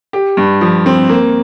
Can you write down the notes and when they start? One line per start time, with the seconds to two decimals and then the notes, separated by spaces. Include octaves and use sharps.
0.13 G4
0.37 G2
0.61 F3
0.86 C4
1.09 A#3